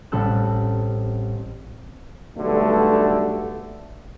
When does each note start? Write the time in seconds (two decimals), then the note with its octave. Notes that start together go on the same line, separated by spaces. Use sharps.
0.12 A1 G3 C4 A4 E6 F#6
2.37 B1 G2 D3 A3